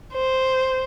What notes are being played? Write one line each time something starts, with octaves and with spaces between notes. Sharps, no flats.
C5